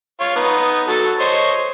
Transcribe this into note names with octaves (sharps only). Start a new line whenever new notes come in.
F4 C#5
B3 D#4
F#3 A4
C5 C#5 D#5